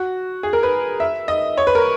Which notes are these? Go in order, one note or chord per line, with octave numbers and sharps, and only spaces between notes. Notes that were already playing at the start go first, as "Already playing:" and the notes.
Already playing: F#4
G#4
A#4
B4
E5
D#5
C#5
B4
A#4